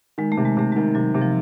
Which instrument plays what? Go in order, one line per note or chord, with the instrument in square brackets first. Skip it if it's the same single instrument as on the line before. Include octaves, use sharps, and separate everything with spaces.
[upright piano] D#3 [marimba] G#3
[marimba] A3
[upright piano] C3
[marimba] G#3
[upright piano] C3 [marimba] A3
[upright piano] D#3 [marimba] G#3
[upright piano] C3 [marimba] F#3
[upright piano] C3
[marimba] F3